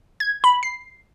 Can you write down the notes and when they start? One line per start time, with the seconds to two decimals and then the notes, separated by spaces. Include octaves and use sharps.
0.20 G#6
0.44 B5
0.63 C7